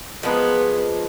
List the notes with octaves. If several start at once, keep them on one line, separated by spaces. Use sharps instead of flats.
F3 G#3 A#3 B3 B4